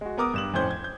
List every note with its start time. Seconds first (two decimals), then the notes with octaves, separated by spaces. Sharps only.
0.01 G#3 F#4
0.18 B3 A#4 D6 D#6
0.34 G2 E7 F#7
0.54 F2 A2 C#4 C5 G6
0.71 G#6
0.84 G6